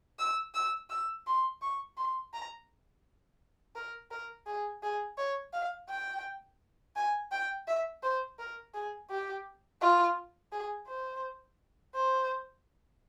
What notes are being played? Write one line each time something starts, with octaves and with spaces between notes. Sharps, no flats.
E6
E6
E6
C6
C#6
C6
A#5
A#4
A#4
G#4
G#4
C#5
F5
G5
G#5
G5
E5
C5
A#4
G#4
G4
F4
G#4
C5
C5